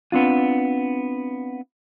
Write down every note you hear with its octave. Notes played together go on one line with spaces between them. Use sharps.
B3 C4 D4 F4